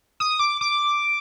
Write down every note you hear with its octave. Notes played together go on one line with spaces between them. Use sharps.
D#6
D6
D6